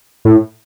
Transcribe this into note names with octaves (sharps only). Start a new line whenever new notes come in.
A2